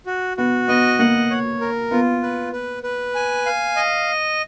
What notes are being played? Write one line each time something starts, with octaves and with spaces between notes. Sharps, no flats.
F#4
B3 F#4
B3 D#5
A#3 F#5
C#5
A#4
B3 F4
B4
B4
B4
G#5
F5
D#5